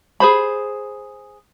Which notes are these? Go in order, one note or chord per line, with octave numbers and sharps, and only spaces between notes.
G#4 C5 B5